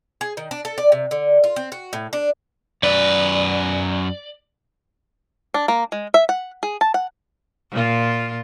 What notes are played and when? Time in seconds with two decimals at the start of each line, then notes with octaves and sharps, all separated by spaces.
0.21 G#4
0.37 D#3
0.51 D4
0.65 A4
0.78 D5
0.92 C3
1.11 D3
1.44 F4
1.56 C4
1.72 F#4
1.93 A2
2.13 D4
2.83 F#2 B4 D5
5.54 D4
5.68 A#3
5.92 G#3
6.14 E5
6.29 F#5
6.63 G#4
6.81 A5
6.94 F#5
7.71 A#2 F4